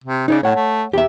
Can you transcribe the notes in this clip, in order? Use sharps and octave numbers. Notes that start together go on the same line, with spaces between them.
C3
C#3 D#4 C#5 D5
A2 C#5 F#5
A3
E2 G4 E5